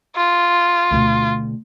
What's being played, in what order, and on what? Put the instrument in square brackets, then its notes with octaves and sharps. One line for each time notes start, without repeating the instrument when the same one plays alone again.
[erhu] F4
[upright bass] D2 B2